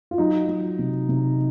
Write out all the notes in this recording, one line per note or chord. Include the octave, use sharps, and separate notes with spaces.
F4
F#3 D#4
F#3
C3
C3